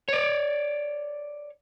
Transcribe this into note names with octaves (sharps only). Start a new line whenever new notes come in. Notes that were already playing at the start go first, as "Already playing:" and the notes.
C#5 D5